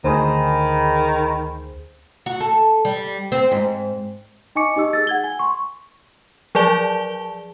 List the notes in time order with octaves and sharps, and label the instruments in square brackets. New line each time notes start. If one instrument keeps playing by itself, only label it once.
[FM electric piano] D2 G#4 [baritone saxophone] D#3 [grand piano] C5 [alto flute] B5
[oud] F#4
A4
G3
C4
G#2
[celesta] D#4 D#5 G#5 C#6 D6 C#7
D#4 G4 D#5 E6
G#4 E6 A6
F#5 G#6 G7
G#5
C6 C#6
[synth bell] F3 F#3 G#4 D5 A5 G7